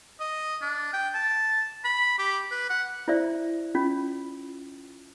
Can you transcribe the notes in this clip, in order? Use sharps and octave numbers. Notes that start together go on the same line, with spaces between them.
D#5
D4
G5
A5
B5
G4
B4
F#5
E4 C5 D5 E5
C#4 F4